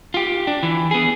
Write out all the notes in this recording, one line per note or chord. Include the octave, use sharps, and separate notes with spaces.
F4 G4
D4
E3
B3 G#4